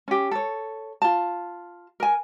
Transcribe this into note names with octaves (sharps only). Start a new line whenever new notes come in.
C#4 G4
A4 C#5
F4 A5
A#4 G#5